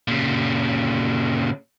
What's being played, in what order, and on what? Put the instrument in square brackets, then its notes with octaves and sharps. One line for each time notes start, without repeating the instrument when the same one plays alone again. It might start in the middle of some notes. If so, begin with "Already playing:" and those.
[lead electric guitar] A#2 C#3